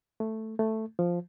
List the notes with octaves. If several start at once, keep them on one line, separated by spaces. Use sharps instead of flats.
A3
A3
F3